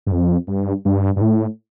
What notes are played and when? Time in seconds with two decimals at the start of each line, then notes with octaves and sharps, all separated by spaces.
0.06 G2
0.12 F2
0.47 G2
0.85 G2
1.16 G2
1.21 A2